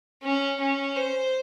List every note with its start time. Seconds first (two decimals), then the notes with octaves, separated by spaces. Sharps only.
0.23 C#4
0.60 C#4
0.96 C5